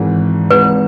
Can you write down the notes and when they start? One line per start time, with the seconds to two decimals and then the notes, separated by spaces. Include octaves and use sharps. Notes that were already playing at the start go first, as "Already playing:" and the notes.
Already playing: G#1 G#2 E3
0.50 G#1 G#2 E3 B4